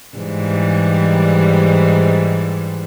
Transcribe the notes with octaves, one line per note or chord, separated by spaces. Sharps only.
G#2 E3 G3